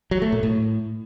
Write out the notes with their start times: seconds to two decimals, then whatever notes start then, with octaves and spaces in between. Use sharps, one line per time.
0.11 F#3
0.22 A3
0.32 A#2
0.43 A2